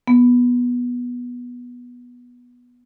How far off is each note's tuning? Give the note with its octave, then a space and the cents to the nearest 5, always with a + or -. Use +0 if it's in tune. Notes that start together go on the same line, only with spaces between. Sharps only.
B3 -15